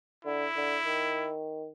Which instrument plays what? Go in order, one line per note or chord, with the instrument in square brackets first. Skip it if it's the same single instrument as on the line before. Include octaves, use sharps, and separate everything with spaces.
[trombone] D3 [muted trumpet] E4
[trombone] D3
D#3